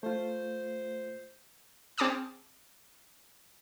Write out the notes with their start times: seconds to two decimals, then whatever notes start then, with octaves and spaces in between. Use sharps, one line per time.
0.03 A3 F4 C5
1.98 C4 G#4 A5 D6 D#6 F6